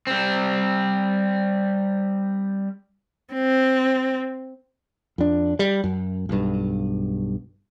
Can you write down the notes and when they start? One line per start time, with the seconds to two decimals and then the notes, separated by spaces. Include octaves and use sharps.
0.07 G3 C4
3.33 C4
5.18 F2 D4
5.59 G3
5.84 F#2
6.29 B1 G2